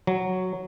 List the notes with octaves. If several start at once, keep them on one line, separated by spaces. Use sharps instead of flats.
F#3